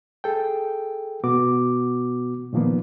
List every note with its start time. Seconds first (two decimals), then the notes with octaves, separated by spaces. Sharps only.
0.24 G#4 A4 G5
1.24 B2 B3 F#4 D6
2.53 A#2 D#3 F3 A#3 B3